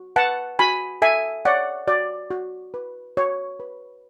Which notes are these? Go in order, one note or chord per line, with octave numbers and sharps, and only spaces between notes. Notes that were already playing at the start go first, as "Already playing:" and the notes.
Already playing: F#4
B4 F#5 A5
F#4 G#5 B5
A4 E5 G#5
C#5 D5 F#5
F#4 D5
F#4
B4
F#4 C#5
B4